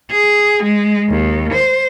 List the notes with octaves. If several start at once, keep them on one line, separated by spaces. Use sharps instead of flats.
G#4
G#3
D#2
C5